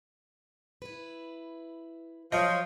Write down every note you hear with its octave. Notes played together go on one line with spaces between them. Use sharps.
E4 B4
F3 F#3 C#5 D#5